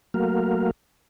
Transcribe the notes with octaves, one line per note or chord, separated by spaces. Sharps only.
F#3 A3 A#3 F#4 A#4 F5